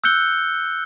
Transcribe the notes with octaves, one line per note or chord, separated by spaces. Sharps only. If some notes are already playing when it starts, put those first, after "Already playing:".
E6 F#6 G6 C#7 G7